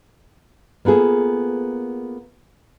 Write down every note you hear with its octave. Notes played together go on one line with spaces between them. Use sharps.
A#3 B3 F4 G#4 A4